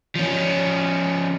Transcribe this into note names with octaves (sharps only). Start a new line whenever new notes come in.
F3 C#4